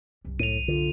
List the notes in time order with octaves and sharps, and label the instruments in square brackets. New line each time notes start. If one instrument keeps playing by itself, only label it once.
[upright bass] C2 F#2
[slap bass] A2 [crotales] D#7 F7
[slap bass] D3 [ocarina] F4